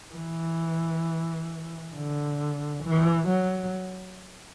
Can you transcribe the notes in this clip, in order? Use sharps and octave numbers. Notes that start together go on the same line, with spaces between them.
E3
D3
E3
F#3